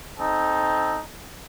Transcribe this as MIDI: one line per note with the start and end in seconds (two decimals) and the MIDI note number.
0.19 1.00 60
0.19 1.00 63
0.19 1.00 69